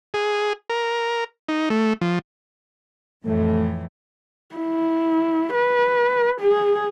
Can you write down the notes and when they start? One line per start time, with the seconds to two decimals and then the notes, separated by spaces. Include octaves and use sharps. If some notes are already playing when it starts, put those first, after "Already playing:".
0.14 G#4
0.70 A#4
1.49 D#4
1.70 A3
2.01 F3
3.25 F2 A2 E3 A3
4.56 E4
5.54 B4
6.41 G#4